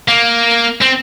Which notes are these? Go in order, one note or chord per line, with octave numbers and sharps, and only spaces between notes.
A#3
C4